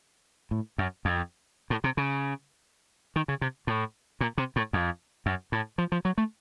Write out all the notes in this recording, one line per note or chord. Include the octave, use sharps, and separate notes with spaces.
A2
F#2
F2
A2
C3
C#3
D#3
C#3
C3
A2
A#2
C3
A2
F2
F#2
A2
F3
F3
F#3
A3